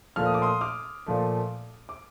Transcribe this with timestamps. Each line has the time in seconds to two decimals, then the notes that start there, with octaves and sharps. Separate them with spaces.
0.16 A#2 F3 A3 F6
0.26 D#6
0.34 D6
0.42 C6 D#6
0.61 D6 F6
1.06 A#2 F3 A3
1.89 D6